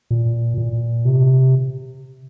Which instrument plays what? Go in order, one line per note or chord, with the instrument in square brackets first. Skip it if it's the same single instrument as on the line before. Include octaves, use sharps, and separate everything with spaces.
[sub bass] A#2
A#2
C3